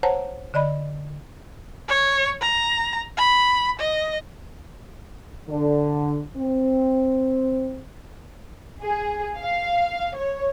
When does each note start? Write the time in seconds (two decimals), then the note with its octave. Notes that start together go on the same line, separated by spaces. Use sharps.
0.03 C5 C#5 F#5 A5 A#5
0.54 D3 D5 D#5 B5
1.89 C#5
2.42 A#5
3.18 B5
3.79 D#5
5.49 D3
6.37 C4
8.83 G#4
9.40 F5
10.15 C#5